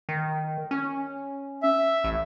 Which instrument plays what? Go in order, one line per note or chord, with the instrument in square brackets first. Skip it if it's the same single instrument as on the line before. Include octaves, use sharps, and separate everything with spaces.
[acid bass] D#3
C#4
[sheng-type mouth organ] E5
[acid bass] A1